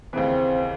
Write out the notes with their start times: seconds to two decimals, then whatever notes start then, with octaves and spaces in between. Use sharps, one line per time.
0.13 D#2 C#3 E3 C4